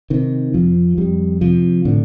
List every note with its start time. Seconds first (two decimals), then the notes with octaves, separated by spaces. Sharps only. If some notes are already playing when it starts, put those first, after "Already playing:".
0.10 C3 D#3
0.54 F2 F3
0.98 F2 G3
1.41 C3 F3
1.85 A2 D3